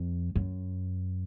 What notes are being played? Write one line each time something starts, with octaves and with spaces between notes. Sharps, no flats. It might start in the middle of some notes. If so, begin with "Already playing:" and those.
Already playing: F2
F#2